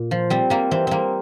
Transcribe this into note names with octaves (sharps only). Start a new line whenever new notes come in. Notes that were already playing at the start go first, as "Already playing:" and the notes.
Already playing: A#2
F3
G3 C4
G3 A#3
E3 C4
G3 A#3 C4